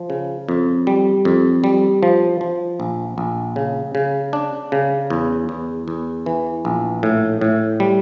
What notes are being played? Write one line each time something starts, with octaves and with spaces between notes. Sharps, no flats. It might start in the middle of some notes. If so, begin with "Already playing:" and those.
Already playing: F3
C#3
F2
G3
F2
G3
F3
F3
A#1
A#1
C#3
C#3
D4
C#3
E2
E2
E2
E3
A#1
A2
A2
G3